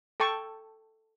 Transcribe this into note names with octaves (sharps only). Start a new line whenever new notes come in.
A4 G5 A5 C#6